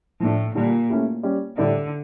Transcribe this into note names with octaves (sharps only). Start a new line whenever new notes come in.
A2 F3 A3 D4
A#2 D3 G3 D4
A3 C#4 E4 G4
G3 C#4 G4 D5
A2 D3 G3 D4 A4 D5